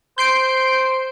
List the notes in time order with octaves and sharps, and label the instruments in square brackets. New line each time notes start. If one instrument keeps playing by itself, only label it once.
[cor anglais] C5 [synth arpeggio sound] G6 C7 D7